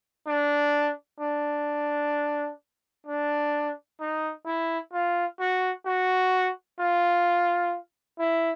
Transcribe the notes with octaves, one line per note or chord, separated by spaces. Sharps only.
D4
D4
D4
D#4
E4
F4
F#4
F#4
F4
E4